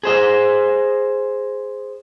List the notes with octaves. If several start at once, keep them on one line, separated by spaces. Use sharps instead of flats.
G#4 C5 D#5